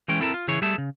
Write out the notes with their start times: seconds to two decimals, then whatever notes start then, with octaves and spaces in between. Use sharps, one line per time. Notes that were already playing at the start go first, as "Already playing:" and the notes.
0.08 E3 G#3 C#4 G5
0.20 C4 E4 A4 A#4 A5
0.34 F4
0.48 C#3 E3 E4 G#4 C#5
0.62 G3 A3 G#4 E5 A5
0.78 C#3